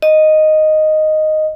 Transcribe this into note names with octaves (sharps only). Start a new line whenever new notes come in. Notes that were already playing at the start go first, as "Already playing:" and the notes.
D#5